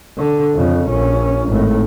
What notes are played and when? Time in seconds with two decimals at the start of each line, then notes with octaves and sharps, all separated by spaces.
0.18 D3
0.55 F2 C#3
0.90 A#1 C#4
1.48 G#1 A2